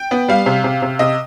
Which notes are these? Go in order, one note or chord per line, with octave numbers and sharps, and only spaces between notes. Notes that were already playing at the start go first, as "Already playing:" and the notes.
Already playing: G5
B3
G3 F5
C3
C3
C3
C3 D#5